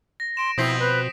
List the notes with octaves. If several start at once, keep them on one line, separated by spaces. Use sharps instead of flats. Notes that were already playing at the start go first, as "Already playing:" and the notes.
A#6
C6 D7 E7
B2 F3 C4 E4 D#6 B6 C7
B4